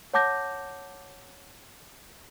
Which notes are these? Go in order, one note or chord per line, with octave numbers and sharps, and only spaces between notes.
C#5 F#5 A5 D6 G6 A#6